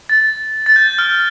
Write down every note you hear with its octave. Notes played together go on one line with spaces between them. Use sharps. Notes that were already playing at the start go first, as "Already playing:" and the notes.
A6
A6
G6
F6